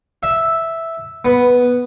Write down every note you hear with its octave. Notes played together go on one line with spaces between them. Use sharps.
E5
B3